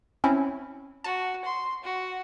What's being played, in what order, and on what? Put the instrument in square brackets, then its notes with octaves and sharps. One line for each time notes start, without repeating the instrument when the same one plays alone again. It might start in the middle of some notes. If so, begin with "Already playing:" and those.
[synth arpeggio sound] C4 C#4 E4
[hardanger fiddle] F#4 [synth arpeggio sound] A5
[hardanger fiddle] C6
F#4